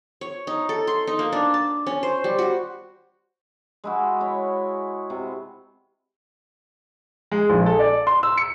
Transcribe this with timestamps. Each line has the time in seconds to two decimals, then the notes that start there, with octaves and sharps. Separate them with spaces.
0.21 C#5
0.47 D#4
0.69 A4
0.87 C6
1.07 D#4
1.19 A#3
1.33 D4
1.54 A5
1.87 C#4
2.03 C5
2.24 G3
2.39 F#4
3.84 G#3 E4 F#4
4.21 E4 C#5
5.10 C3
7.32 G#3
7.50 A#1
7.66 A4
7.79 D5
8.07 C6
8.23 E6
8.38 C#7